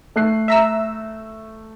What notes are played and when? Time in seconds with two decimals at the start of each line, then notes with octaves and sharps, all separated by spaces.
0.16 A3 F#6 C7
0.48 E5 A#5 E6